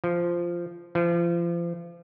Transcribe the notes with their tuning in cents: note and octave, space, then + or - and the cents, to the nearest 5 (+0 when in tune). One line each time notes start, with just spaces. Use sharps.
F3 -10
F3 -35